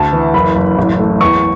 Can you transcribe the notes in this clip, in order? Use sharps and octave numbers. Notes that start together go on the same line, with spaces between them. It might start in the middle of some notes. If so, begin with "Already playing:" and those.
Already playing: D2 A5
E3
F#1 B5
F#1
A1
A3
E2 C#6